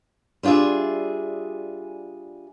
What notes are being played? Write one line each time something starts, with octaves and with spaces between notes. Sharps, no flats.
G3 D4 F4 G#4 E5